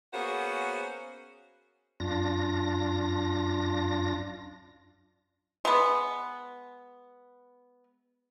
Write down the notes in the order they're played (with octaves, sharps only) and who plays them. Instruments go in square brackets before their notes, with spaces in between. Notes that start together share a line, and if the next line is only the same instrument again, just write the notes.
[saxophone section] A#3 B3 C#4 F#4 G#4 C5
[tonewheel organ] F#2 D4 F4 A#6
[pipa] G#3 B3